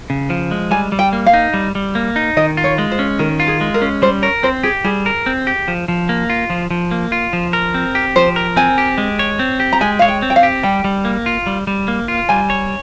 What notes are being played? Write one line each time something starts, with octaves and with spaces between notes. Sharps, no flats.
C#3
F3
G#3
G3 G#5
G3
G5
A#3
F5
D#4
G3
G3
A#3
D#4
D#3 D#5
F4
C#5
G#3
C5
C#4
D#3 A#4
F4
G#4
G#3
A#4
C#4
G3 C5
A#4 C#5
C4 C5
G4 G#4
G3 G#4
A#4
C4
G4
F3
F3
A#3
F4
F3
F3
A#3
F4
F3
A#4
C4
G4
F3 C5
A#4
C4 G#5
G4
G#3
C#5
C4
G4
A#5
G#3 G#5
C#5 F5
G5
C4
G5
F5
G4
G3 G5
G3
A#3
F4
G3
G3
A#3
F4
G3 G#5
C#5